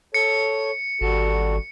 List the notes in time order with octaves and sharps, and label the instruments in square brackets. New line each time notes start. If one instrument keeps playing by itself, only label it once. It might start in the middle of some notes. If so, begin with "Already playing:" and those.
[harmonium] A4 C#5 [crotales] C#7
[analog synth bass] G#1 [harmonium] G3 F#4 A4